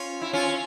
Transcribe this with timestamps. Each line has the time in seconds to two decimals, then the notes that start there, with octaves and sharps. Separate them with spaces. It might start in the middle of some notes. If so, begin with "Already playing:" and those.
Already playing: C#4 F4
0.22 E4
0.33 C#4 F4